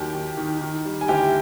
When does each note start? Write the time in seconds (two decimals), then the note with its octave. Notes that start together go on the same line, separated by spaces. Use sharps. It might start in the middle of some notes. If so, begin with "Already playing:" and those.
Already playing: D#2 F#3 G4 G5
0.15 D#2
0.37 D#3
0.61 D#3
0.85 G3
1.01 G#5
1.08 D2 G4 G5